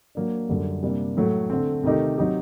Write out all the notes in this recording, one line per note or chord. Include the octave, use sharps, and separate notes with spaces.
F#3 A#3 D4
F#2 D3 G3
C3 G3 A#3 D4
A2 F#3 A3
D3 A3 C4
C3 D#3 A3 D#4 G4
F#3 C4 D#4 G4